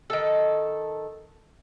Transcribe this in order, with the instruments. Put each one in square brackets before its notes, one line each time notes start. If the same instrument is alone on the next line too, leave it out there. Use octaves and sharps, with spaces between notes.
[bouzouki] D#3 A4